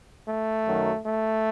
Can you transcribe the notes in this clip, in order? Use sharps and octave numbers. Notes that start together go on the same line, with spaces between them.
A3
F#2 D#3 F#3
A3